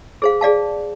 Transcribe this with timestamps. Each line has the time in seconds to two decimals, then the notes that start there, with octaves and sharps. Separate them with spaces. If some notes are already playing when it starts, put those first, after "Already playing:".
0.22 G#4 C5 F5
0.41 G#4 D5 F5 A5